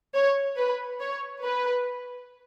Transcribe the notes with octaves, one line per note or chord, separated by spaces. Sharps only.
C#5
B4
C#5
B4